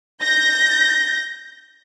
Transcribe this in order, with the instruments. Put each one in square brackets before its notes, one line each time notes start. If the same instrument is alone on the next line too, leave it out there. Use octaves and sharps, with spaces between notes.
[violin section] G6 A#6